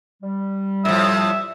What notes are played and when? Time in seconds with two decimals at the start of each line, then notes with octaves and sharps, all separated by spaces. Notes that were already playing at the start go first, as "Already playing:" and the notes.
0.23 G3
0.85 A2 F3 E5